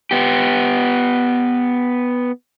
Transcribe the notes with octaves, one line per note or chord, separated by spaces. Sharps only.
B3 G4